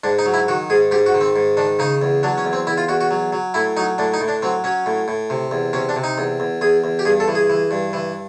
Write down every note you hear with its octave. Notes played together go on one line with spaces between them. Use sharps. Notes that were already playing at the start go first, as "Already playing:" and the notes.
G#2 D4
D#4
F#3
E4
D#3 F#4
G#2 G#4
G#2 G4
F#4
D#3
C4
G#2
D#3 D4
C#3 D#4
E2
F#3 D4
C#4
E2
C4
E2 E4
F4
E2 F#4
F#4
F#3
F#3
A2 E4
F#3 D#4
A2 D4
D#4
A2
D4
F#3 C4
F#3 C#4
A2
A2
C3
E2
C3 C#4
D4
C3
D#4
E2
E2
E2 G#4
E2
G4
G2 G#4
A4
E3
G#4
E3
G2
E3